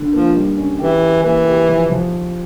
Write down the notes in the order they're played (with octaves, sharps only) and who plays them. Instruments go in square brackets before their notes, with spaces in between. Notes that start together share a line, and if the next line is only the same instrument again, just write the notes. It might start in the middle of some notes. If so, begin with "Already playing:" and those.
Already playing: [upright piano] D3
[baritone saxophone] F3 [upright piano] A#3
[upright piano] G3
C#4
[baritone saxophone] E3 [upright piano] G4
[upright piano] G4
[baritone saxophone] E3 [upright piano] A#3
[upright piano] G4
F3
F3